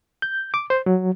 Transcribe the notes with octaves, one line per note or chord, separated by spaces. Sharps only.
G6
D6
C5
F#3